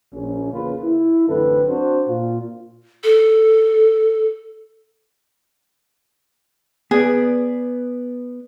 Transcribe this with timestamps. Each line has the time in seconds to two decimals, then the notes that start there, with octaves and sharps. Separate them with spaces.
0.13 A#1 C#4
0.52 E2 C#3 A#3 F4 B4
0.82 E4
1.27 A1 F#2 D3 C4 A4 B4
1.68 C4 D4 F#4 C5
2.08 A#2 F4
3.04 A4
6.91 B3 G#4 B4 D5